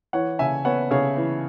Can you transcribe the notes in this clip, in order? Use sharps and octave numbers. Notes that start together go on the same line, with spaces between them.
E3 C#5 F#5
C#3 E5 G#5
B3 C#5 F#5
C#3 G#4 C#5
E3